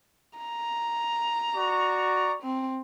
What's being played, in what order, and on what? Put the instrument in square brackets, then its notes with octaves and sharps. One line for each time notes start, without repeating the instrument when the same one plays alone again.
[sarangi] A#5
[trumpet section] F#4 D5 C#6
[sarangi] C4